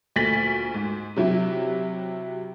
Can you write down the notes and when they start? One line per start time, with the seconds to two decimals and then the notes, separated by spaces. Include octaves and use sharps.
0.16 D2 A#2 A3 A6 B6 F#7
0.74 G#2
1.16 C3 F#3 E4 G4